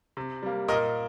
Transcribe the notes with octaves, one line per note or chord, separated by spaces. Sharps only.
C3
G3 A#3
A#2 A#4 D#5